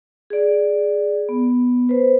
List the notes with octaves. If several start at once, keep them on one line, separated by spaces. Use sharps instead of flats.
G#4 D5
B3
B4 C5